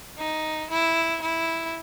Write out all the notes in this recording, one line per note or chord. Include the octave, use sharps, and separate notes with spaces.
D#4
E4
E4